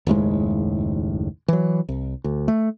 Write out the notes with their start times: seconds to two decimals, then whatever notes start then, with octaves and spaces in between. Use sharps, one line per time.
0.07 F#1 D#2 A2 G#3
1.48 E3 F#3
1.89 C2
2.24 D2
2.48 A3